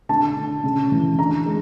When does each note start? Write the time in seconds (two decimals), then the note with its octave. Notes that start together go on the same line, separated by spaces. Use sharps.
0.09 D3 A5
0.37 D3
0.64 C#3
0.92 E3
1.18 D3 A#5
1.46 G#3